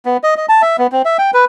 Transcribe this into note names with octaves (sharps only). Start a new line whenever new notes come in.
B3
D#5
D#5
A5
E5
B3
C4
E5
G5
B4